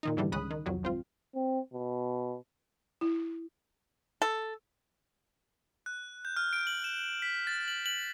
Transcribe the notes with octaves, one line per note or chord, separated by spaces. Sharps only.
A#2 D#3 D#4
G#2 D3 E3 G3
C#2 C#3 B5 D#6 F#6
D#3
C2 F2 F#3
G#1 C4 F4
C4
B2
E4
A4
F#6
G6
F6
D7
F#7
E7
B6
A6
F#7
F#7